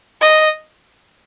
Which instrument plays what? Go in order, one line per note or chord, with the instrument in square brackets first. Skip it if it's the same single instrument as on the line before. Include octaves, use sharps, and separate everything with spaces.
[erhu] D#5